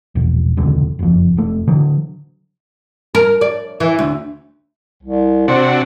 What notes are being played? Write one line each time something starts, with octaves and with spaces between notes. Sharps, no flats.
E1 A#1
E1 C#2 D3 F#3
F#1 F2
F1 A3
D3 F#3
A#4
D5
E3
D2
C2
C3 D4 F#4 C5